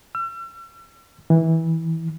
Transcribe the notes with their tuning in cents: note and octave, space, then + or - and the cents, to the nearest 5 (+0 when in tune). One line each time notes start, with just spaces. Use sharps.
E6 +45
E3 -20